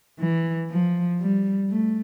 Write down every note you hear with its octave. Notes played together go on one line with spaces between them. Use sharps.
E3
F3
G3
A3